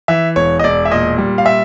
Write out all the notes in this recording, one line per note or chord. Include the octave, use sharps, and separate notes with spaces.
E3 E5
E1 C#5
D#5
E1 D5
E5
A#2 D#5
G3
F5
E5